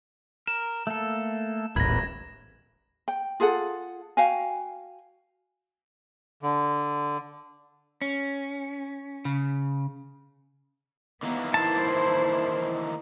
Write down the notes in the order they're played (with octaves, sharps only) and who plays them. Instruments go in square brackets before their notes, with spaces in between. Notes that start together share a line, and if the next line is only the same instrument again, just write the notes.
[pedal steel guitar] A#4 [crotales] E7
[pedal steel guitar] A3 A#3 A4
[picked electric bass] D#1 A1 [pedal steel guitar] A#4 B4 B5 [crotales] G#6 A#6
[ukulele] G5
F4 G#4 A4 F#5
F#4 F5 G5 G#5
[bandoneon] D3
[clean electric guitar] C#4
C#3
[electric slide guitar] D#3 E3 A#3 [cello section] B3
[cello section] E4 C5 [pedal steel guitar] A5